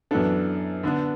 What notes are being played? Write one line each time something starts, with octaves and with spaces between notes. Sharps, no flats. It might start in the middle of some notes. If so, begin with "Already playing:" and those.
F#2 E3 B3 D4 A4
D3 B3 D4